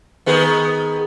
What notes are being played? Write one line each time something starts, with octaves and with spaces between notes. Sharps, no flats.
D#3 B3 G#4